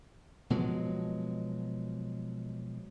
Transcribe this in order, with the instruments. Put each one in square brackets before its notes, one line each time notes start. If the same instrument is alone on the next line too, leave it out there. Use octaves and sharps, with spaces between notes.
[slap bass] B2 F3 F#3 G#3